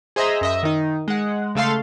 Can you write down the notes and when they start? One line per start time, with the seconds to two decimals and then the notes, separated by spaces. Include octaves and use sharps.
0.16 G#4 C5 D#5 E5 A#5
0.41 F#2 D#5 E5
0.63 D#3 D#4
1.08 G#3 F#5
1.55 C#3 A3 A4 F5 C6